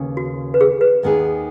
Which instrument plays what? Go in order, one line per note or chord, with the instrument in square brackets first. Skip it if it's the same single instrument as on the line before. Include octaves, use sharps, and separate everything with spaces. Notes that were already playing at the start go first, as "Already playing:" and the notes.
Already playing: [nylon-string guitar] D#2 C#3 B3
[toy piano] F#4
B4
G#4
B4
[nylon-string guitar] D#2 D#3 B3 G#4